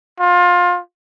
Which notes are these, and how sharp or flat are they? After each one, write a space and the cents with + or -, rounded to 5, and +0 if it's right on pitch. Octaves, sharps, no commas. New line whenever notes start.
F4 +25